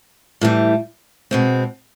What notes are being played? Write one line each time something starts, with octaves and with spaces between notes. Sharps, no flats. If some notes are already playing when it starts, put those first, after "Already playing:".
A2 E3 G3
B2 G#3 C4